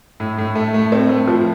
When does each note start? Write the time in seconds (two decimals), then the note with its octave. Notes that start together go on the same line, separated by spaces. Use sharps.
0.20 A2
0.38 A2
0.55 A3
0.74 A3
0.92 C4
1.09 A3
1.28 F3